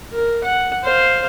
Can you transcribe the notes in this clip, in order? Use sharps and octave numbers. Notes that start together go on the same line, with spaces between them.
A#4
F#5
C5 F5